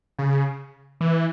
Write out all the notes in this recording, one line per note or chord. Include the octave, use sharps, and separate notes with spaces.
C#3
E3